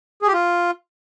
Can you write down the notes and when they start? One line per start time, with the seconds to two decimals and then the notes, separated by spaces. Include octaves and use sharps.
0.22 G#4
0.28 G4
0.33 F4